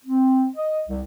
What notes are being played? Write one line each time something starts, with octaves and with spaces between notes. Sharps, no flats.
C4
D#5
C2